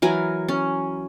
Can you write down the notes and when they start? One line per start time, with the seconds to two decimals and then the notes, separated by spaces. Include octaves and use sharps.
0.02 E3 F#3 A#4 G#5
0.48 C#4